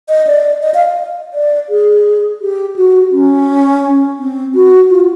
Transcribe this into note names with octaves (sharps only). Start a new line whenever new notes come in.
D#5
D5
D#5
F5
D5
G#4
G4
F#4
C#4
C4
F#4
F4